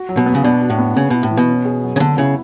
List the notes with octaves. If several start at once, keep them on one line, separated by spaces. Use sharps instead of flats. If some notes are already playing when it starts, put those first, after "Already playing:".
Already playing: F#4
F#3
B2
B3
C#3
B2 D4
F#4
A2
B3
C#3 B3
B2 E4
A2
E3
B2
C#4
G#4
F#3
C#3
D3 B3
C#3 E4